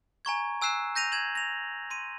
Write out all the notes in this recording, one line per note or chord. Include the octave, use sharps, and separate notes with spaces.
G#5 A#5 C#6 G#6
G#5 E6 F#6 C7 E7
G6 A#6 D#7 F7
G#6 E7 F#7
A#6 F7
C6 D#7